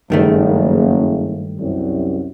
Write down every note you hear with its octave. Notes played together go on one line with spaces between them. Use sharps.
F#1 G2 D#3 A3
C2 F#2